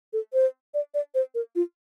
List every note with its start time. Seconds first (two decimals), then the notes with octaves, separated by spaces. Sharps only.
0.13 A4
0.33 C5
0.74 D5
0.94 D5
1.14 C5
1.35 A#4
1.55 F4